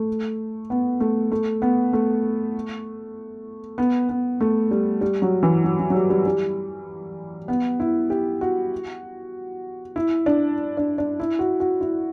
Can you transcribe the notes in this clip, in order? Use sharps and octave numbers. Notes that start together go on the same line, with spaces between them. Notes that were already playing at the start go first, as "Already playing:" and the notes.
Already playing: A3
B3
A3
A3
B3
A3
B3
B3
A3
G3
G3
F#3
E3
F#3
F#3
F#3
G3
G3
G3
B3
E4
G4
F#4
E4
D4
D4
D4
E4
F#4
F#4
E4